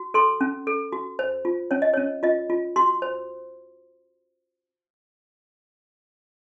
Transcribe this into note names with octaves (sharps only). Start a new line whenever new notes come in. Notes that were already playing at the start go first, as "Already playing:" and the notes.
Already playing: F#4
A4 C6
C#4
A4
F#4
C5
F4
C#4 C#5
D#5
C#4 C#5
F4 D#5
F4
F#4 C6
C5